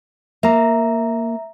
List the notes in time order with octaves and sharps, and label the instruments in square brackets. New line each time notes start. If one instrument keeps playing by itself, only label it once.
[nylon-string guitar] A#3 [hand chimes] E5 A#5